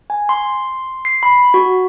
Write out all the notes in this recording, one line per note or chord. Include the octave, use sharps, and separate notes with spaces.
G#5
C6
C7
B5
F#4